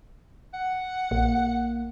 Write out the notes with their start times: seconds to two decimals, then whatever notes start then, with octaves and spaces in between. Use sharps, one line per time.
0.54 F#5
1.11 A#1 A#3